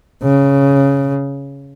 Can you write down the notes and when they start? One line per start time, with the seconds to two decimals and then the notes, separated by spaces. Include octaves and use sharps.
0.23 C#3